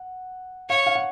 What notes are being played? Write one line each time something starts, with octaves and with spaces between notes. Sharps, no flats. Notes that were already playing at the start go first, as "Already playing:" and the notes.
Already playing: F#5
C#5 F5
F5
F#5